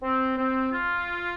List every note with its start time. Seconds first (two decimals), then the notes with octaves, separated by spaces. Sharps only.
0.02 C4
0.37 C4
0.71 F4